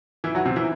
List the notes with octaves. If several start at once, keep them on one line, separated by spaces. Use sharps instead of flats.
E3 E4
F#3 F#4
C3 C4
E3 E4